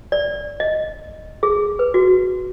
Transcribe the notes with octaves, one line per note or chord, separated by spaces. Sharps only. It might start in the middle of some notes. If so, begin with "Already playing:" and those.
D5
D#5
G#4
B4
F#4